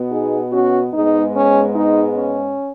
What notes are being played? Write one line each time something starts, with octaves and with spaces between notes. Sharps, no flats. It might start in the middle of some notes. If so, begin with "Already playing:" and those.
Already playing: B2 B3
D#4 G#4
C#4 F#4
G#2 G#3 B3 D#4
C#4
D#4
C#4